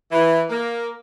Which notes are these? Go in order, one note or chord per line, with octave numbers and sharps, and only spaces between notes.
E3
A#3